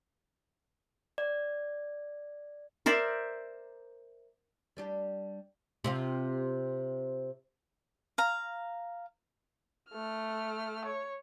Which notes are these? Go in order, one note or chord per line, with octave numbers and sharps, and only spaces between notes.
D5
A#4 C5 D5 E5
G3 D4 G4
C3 C4 F4
F5 A#5
A3 F6
C#5